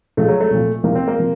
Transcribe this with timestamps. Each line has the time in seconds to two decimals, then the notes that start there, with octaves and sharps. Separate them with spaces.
0.17 C#2 C#3 F3 A3
0.28 F#3
0.41 A3
0.51 C2 A#2 F3
0.83 C2 C3 F3 A#3
0.95 C4
1.08 A#3
1.18 C3 F3